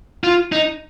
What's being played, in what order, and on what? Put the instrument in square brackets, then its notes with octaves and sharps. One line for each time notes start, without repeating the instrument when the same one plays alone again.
[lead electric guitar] F4
D#4